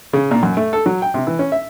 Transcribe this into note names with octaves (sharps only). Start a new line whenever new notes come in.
C#3
A#2
F#2
A3
A4
F#3
G5
C3
E3
C#4
E5